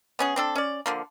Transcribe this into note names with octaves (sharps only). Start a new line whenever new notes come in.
B3 C#4 G#4
C4 D4 A4
C#4 D5
D3 F3 A#3